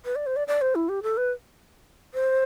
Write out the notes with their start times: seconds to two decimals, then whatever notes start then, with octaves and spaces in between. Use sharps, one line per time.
0.05 B4
0.16 D5
0.26 C5
0.36 D5
0.48 D5
0.61 C5
0.75 E4
0.89 G4
1.03 A4
1.17 B4
2.14 C5